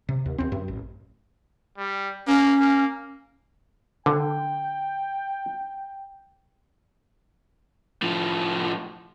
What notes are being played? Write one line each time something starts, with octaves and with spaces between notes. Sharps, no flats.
C3
D#2
D#2 C4
F#2
A1
G3
A#3 C#4
A#3
D3 G5
A2 F3